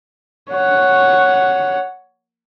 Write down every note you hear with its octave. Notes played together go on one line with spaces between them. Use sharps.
C#5 F#5